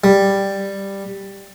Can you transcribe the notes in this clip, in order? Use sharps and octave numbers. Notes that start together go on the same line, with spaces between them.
G3